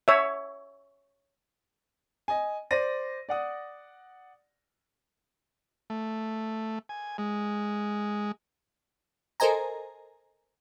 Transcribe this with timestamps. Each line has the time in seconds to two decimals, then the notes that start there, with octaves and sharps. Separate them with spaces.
0.08 C#5 E5
2.28 D#5 G#5
2.71 C5 D5 A#6 D#7
3.29 D5 F#5 D#6
5.90 A3
6.89 G#5
7.18 G#3
9.40 A4 A#4 C5 D#5 G#5 A#5